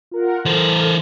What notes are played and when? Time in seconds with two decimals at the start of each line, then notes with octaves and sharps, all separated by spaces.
0.11 F4 A#4 F#5
0.45 E3 A4 A#4 C5